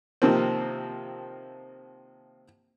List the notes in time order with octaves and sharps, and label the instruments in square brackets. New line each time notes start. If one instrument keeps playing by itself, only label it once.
[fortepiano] C3 D#3 F3 A#3 C4